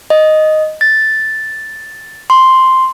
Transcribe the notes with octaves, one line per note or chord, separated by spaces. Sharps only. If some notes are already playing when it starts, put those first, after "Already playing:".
D#5
A6
C6